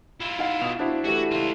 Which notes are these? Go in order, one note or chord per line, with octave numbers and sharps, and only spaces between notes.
E4 F4
D#4 F5 F#5
B2 D#6 F7
D4 E4 F#4 C5 D5
E3 A3 F#4 G4
C#2 F4